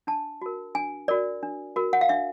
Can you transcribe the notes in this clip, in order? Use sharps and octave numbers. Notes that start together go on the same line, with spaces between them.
D4 A5
F#4 A#4
D4 G#5
F#4 A#4 D5
D4
F#4 A#4
F#5
F5
D4 E5